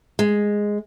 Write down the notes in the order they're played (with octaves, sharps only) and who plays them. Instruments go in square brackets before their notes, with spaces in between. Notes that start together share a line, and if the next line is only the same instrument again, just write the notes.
[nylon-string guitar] G#3